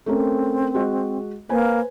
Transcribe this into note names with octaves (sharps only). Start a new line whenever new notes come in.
A3 C4 C#4 A#4
G#3 F#4 D#5
A#3 B4 C5 G#5